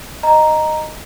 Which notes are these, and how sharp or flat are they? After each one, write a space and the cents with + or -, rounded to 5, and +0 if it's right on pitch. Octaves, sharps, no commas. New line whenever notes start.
D#5 -10 A#5 +0